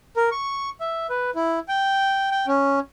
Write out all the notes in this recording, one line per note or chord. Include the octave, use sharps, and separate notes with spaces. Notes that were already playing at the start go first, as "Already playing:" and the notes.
A#4
C#6
E5
B4
E4
G5
G5
C#4